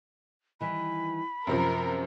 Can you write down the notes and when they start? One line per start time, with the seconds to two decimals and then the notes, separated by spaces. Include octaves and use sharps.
0.61 D#3 E3 G3 B5
1.47 F#2 C3 F3 C4 A#4